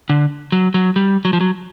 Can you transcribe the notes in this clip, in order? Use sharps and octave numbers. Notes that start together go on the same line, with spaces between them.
D3
F#3
F#3
G3
F#3
F3
F#3